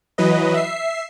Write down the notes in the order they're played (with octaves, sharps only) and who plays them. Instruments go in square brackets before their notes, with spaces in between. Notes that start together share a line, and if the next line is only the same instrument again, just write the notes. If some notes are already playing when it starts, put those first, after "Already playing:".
[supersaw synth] E3 F#3 B4 D#5
E5 C7